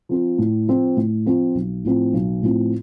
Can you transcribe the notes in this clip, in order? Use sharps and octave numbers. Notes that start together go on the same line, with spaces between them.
F3 C4 F4
A2
F3 C4 F4
A2
F3 C4 F4
B1
A2 F3 C4
B1
A2 F3 C4